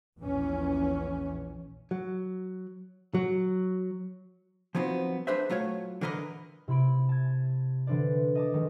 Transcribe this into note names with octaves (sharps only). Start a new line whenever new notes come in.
A#1 E2 E3 C#4
F#3
F#3
F3 F#3 B3 C4 D#4
D4 G#4 B4 C5 E5
F#3 A3 F4 C#5
D3 E3 A#4 B4 D#5
C3 E4 B5 D7
A5 G#6
D3 E3 D4 C5 D5
D#5 A5 D6
D#3 G#3